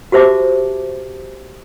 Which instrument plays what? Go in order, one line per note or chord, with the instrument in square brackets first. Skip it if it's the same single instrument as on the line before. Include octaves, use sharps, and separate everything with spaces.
[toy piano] F#4 G4 C5 E5 A5 D6